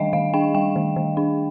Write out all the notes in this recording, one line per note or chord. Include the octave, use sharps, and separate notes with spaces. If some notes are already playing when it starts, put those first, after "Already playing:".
Already playing: D#3 G3 D4 D#5 F5 G5
D#3 F5
D4 G5
G3 G5
D#3
D#3
D4